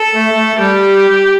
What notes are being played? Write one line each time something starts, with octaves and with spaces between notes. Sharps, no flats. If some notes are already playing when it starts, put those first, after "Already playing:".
Already playing: A4
A3
A3
G3 G4